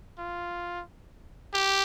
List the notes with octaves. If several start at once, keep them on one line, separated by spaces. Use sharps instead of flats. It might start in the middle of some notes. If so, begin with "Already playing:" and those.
F4
G4